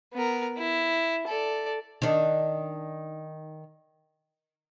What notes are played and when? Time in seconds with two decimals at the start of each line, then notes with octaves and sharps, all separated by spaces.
0.14 B3 A#4
0.58 E4
1.27 A4 D5
2.02 D#3 D4